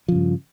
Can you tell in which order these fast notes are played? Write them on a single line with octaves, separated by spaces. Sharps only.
F3 C#3 G2